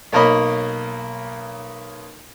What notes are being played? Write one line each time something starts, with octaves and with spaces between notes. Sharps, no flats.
B1 A#3 A#4 C#5 D#5 B5